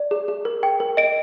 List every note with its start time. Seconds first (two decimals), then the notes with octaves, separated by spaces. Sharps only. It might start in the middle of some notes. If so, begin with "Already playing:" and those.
Already playing: D5
0.11 G#4
0.28 G#4
0.45 A#4
0.63 G5
0.80 A#4
0.97 D#5 D7